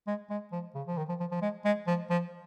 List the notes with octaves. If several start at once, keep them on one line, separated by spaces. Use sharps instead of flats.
G#3
G#3
F3
C#3
F3
D#3
F3
F3
F3
G#3
G#3
F3
F3